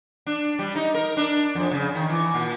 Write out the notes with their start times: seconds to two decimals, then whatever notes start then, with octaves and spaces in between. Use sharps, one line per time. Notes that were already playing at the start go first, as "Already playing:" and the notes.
0.27 D4
0.59 G3
0.76 D#4
0.94 A#4
1.17 D4
1.55 F2
1.71 C#3
1.95 D#3
2.09 E3
2.35 A#2